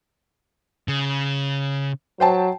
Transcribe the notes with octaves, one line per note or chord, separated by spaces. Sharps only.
C#3
F#3 C5 G5 A5